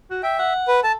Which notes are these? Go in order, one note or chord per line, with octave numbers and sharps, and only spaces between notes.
F#4
E5 G5
F#5
B4
A4 A5